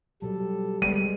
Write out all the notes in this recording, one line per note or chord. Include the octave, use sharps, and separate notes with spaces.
B2 F#3 G3 A4
G3 G#3 B3 D#7